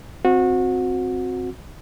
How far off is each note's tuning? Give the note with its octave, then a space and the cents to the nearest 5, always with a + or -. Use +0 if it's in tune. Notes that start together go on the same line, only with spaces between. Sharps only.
C4 +0 F#4 -25